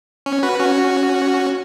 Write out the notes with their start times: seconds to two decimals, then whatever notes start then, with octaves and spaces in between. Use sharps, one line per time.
0.26 C#4
0.43 F#4 B4
0.59 C#4 F#4